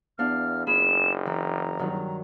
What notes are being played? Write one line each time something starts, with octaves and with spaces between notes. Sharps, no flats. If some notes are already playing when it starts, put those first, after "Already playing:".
E2 B3 D4 F5 F6
F#1 F4 G#4 B5 E7
E3 A#5
G2 D#3 F#3